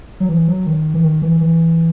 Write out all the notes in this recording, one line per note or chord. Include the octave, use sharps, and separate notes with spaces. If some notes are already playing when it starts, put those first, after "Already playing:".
F#3
E3
F#3
D#3
E3
D#3
E3
E3